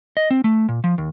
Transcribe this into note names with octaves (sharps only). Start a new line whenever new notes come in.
D#5
C4
A3
A#2
F3
D#2